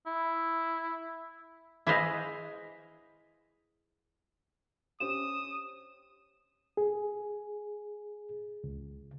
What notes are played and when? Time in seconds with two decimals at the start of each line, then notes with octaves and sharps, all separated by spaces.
0.07 E4
1.87 E4 G#4 B4 C5 D#5 F5
5.00 C#4 G4 C5 D#6 E7
6.77 G#4
8.64 C#2